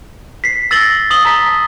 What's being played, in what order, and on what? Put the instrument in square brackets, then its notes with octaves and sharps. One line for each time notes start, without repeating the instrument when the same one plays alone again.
[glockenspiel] B6 C7
E6 A6 A#6 F#7 G7
D#6 F#7 G7
A5 A#5 B6